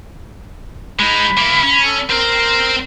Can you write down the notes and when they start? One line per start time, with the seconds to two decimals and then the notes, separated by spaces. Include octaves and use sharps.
1.00 G#3 D#4 B5
1.38 A#3 E4
1.63 C#4
1.85 A4
2.10 C4 A#4 C5